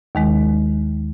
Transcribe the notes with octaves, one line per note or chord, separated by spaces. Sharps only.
D#2 D#3 G#3